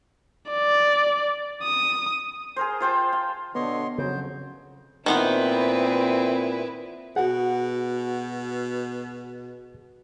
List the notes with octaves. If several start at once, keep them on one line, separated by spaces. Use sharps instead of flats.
D5
D#6
G#4 A#4 C5
F4 C5 G5 A5
F5
B2 D3 B3 C#5 D#5 C6
F2 C#3 F#3 C5
A#2 D#3 B3 C4 E4 B4 C5
B2 F#4 G#4 F#5